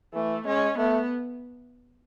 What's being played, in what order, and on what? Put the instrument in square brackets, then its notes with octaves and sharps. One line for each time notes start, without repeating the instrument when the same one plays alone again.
[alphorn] E3 [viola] A3
[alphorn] G#3 [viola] C#4
[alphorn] A3 [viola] B3